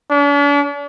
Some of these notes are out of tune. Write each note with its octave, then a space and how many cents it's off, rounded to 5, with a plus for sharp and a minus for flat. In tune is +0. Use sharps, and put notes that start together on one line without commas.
D4 -45